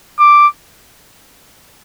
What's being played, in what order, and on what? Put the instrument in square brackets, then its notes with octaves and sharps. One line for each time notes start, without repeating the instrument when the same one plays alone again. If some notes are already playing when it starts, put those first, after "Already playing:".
[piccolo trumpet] D6